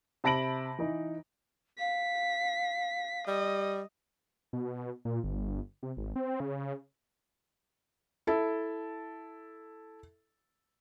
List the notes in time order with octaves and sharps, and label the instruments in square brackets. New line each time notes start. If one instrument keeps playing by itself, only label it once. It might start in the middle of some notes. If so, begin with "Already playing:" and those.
[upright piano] C3 A5 B5 A#6 D7 F#7
E3 D#4
[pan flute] F5 [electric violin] B6
[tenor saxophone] G3 [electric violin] D#5
[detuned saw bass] B2
A#2
G1
C3
G#1
C4
C#3
[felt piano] E4 A4